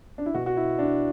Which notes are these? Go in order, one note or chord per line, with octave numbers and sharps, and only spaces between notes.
D4
E4
B2 F#4
F#4
E4
D4